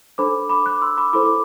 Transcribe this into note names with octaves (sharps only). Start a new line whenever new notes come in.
D4 A4 C5 B5 D6
B5 D6
D6 F#6
C6 E6
B5 D6
E4 A4 C5 B5 D6
D6